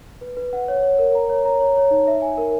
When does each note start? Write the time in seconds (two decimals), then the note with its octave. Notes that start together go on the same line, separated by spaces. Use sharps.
0.21 B4
0.37 B4
0.53 F#5
0.68 C#5
0.83 C#5
0.98 A#4
1.15 A#5
1.30 C#5
1.45 A#5
1.60 C#5
1.76 C#5
1.91 D#4
2.07 E5
2.22 G#5
2.38 A#4